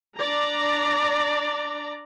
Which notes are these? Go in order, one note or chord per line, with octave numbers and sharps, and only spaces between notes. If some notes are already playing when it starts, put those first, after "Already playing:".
D4 D5 A#5